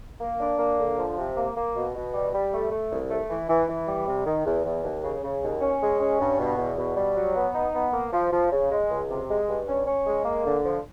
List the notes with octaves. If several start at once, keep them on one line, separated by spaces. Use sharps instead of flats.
A#3
D4
A#3
D3
F3
C3
A#3
A#3
B2
B2
G3
G3
A3
A3
C2
A3
E3
E3
E3
G3
C3
D#3
E2
E2
D#2
C#3
C#3
D#2
C#4
G#3
C#4
G2
B2
E2
B2
G3
F#3
B3
D#4
B3
A#3
F3
F3
C#3
G#3
C#2
C3
G#3
G2
C#4
C#4
G#3
A#3
D3
F3